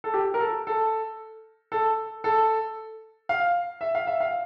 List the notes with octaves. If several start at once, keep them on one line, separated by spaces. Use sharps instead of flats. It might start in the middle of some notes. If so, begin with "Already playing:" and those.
A4
G4
A#4
A4
A4
A4
A4
F5
E5
F5
E5
F5